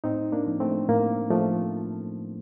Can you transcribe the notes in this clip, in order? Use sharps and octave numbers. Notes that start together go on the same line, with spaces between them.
A2 C4 D#4
A#3 D4
F3
A3 C4
A2 A#3
F3 A3